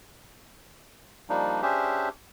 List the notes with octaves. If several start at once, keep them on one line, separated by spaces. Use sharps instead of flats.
F3 G3 A#3 D4 D#4
C#4 D4 G4 G#4 C5 E5